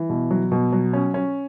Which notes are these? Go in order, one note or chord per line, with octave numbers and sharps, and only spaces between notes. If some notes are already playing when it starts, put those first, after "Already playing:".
Already playing: E3
B2
F#3
B2
F#3
C#4
C#4